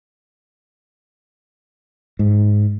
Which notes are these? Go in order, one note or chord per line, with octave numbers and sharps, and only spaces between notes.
G#2